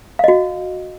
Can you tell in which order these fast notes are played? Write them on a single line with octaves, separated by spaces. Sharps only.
F5 D#5 F#4